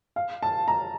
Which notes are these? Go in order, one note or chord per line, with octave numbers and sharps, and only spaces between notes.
F5
A5
A#5